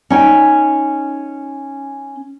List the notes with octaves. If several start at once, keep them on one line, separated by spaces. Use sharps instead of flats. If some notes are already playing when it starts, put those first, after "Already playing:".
C#4 D#4 G5